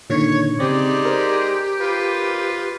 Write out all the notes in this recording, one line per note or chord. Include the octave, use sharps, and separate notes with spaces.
A#2 D3 D#3 C#5
C#3 G#3 C4 D#4 G4 D5
A#4 C5
F4 B4